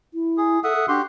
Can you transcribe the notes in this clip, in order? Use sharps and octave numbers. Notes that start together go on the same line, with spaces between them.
E4
G#4
A4 E5 F#5 D#6
A4
D4 F#4 G4 C6